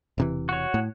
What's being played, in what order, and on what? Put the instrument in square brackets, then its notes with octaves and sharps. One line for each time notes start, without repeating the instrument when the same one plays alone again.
[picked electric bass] E1 C3 E3
[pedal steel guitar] F#4 C#5
[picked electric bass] A2